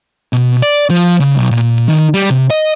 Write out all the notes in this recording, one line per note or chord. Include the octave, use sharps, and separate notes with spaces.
B2
D5
F3
C#3
B1
A#2
D#3
G3
C3
D#5